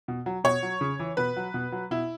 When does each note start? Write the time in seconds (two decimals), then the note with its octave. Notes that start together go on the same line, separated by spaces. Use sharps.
0.08 B2
0.26 F#3
0.44 B2 C#5
0.63 F#3
0.81 C#3
0.99 E3
1.17 B2 B4
1.36 F#3
1.54 B2
1.72 F#3
1.91 B2 E4